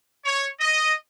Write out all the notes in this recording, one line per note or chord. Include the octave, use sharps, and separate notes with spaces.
C#5
D#5